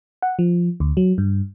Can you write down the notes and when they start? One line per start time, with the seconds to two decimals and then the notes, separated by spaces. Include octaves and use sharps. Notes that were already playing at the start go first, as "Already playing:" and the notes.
0.22 F#5
0.39 F3
0.80 D2
0.97 F#3
1.18 G2